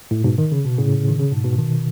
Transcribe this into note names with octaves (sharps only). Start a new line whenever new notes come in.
A2
G#2 B2
D#3
C#3
B2
A2 C#3
D#3
C#3
G#2 B2
G#2 B2
B2 D#3